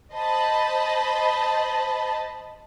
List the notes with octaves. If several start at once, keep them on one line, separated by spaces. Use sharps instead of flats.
C5 D#5 A5 B5